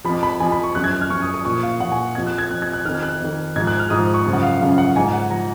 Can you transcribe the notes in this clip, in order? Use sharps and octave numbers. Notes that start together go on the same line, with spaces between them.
F2 F3 B5
B5
F2 F3 G#5
B5
C#6
F#2 F3 F#6
G#6
F#6
F6
F#2 F3 C#6
D#6
D#6
A#2 F3 C#6
F5
A#2 F3 F#5
G#5
F2 F3 G#6
F#6
G#6
F2 F3 F#6
G#6
F#6
F2 D#3 F6
F#6
F2 D#3
G#2 F3 G#6
F#6
F6
G#2 F3 D#6
C#6
F#2 C#3 F3
F#5
F5
F#2 C#3 F3 F5
F#5
G#2 F3 G#5
F#5
F3 A#5